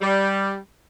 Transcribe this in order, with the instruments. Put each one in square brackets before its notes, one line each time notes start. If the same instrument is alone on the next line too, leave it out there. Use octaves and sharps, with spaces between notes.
[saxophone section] G3